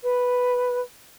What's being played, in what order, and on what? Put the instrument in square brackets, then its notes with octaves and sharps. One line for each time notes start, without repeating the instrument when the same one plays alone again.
[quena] B4